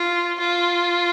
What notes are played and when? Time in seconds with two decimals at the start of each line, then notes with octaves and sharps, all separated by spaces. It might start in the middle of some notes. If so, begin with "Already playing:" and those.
Already playing: F4
0.40 F4